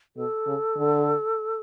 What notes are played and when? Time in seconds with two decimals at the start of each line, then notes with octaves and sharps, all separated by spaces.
0.16 B2 A4
0.46 C#3
0.77 D3